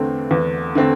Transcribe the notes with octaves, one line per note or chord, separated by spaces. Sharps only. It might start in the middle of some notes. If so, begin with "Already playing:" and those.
Already playing: E2 D3 A3 C4
E2
D3 A3 C4